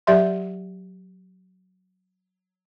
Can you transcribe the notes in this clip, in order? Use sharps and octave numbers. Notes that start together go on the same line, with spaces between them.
F#3 G4 D5 E5 C6